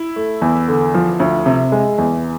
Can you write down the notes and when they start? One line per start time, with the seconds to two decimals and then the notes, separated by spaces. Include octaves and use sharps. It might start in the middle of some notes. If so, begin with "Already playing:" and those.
Already playing: E4
0.16 A3
0.41 E2
0.68 D3
0.94 F3
1.20 D2
1.46 C3
1.72 G#3
1.98 E2